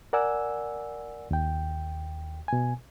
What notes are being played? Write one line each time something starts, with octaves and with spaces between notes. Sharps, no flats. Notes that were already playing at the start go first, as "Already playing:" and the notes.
A#4 D5 F#5 G#5 E6
D#2 G5
B2 G#5